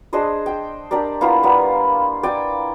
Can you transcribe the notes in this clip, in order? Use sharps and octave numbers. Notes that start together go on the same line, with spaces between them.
D4 G#4 C5 D#5
G5
D4 G4 A#4 D5
A#3 B3 E4 F4
G3 A#3 B3
D5 G5 G#5